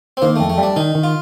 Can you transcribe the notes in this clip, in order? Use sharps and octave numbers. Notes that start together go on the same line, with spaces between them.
C4
D#3 A#3
F2 A3
A3
G3
D4
D#3 D#4
D#3
F4